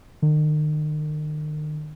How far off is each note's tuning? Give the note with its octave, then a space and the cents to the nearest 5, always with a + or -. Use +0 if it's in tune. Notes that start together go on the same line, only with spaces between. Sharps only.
D#3 -40